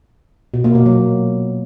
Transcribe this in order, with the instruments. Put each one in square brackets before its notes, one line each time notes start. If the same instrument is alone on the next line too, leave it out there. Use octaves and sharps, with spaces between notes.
[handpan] B2
A#3
B2
F#3